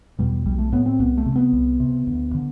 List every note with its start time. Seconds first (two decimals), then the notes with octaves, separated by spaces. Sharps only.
0.19 E2 B2 G3
0.46 B1 G3
0.59 A3
0.72 A2 B3
0.86 C4
0.99 C2 B3
1.17 A3
1.26 C3
1.36 B3
1.53 C2
1.80 C3
2.07 D2
2.34 D3